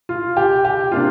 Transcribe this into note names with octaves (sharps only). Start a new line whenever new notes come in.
F4
G4
G4
C3 A#3 D4 F4